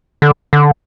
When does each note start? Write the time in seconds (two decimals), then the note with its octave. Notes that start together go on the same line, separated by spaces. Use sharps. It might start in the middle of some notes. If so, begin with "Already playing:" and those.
0.22 D3
0.53 D3